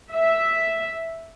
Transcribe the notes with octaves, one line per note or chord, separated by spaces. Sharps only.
E5